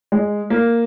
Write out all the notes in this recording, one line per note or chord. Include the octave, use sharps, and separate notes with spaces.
G#3
A#3